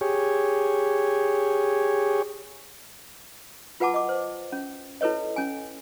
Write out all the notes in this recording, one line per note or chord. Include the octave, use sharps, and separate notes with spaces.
G4 G#4 C#5
F4 B4 F#5 A5 D6
D#5 D6
C5
C#4
E4 A4 B4 C#5 D#5
C#4 G#5